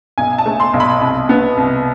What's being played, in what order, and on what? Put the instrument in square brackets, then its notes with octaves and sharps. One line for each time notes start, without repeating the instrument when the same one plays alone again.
[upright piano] B1 G#5
A5
A3
C6
B1
B5
C2
B3
C2